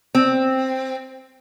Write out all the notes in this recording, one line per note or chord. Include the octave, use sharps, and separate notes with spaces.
C4